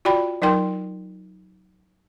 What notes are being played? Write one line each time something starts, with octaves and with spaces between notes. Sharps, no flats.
F4 F#4 D5 G5 B5
F#3 D#4 A#4 G5 C6